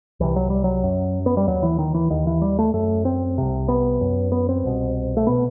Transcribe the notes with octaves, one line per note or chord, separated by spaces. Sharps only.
C2 C3 E3
F#3
G3
F#3
F#2
B3
G3
D#2 F#3
E3
D#3
E3
D#2 D#3
E3
G3
A3
F#2 A3
C4
C2 C3
B3
F#2
B3
C4
C2 B2
A3
B2 B3